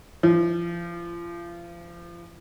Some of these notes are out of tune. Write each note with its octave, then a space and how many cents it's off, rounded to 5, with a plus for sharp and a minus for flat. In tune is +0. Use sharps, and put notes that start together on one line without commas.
F3 -30